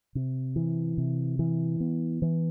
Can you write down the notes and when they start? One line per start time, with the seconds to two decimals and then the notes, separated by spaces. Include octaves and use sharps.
0.15 C3
0.56 E3
0.98 C3
1.39 E3
1.80 B3
2.22 E3